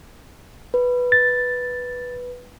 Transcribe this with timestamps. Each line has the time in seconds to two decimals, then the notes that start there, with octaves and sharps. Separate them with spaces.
0.74 B4
1.12 A6